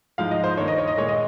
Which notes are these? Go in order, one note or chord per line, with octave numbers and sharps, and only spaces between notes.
G#2 F3 G#3 F5
D#5
C5
G2 D#3 A#3 C#5
D#5
C#5
D#5
A#2 G#3 C#5
D#5